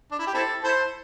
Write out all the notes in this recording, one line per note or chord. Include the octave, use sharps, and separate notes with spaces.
D4
E4
G4
C4 E4 A4
E4 A4 C5